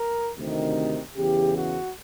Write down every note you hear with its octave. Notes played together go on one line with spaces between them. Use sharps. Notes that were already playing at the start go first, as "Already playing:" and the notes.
Already playing: A#4
D2 C3 D#3
E2 C#3 E3 G4
F#4